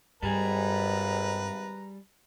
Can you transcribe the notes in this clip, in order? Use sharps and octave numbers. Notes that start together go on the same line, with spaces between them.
G#1 G2 G3 G#4 B4 A#5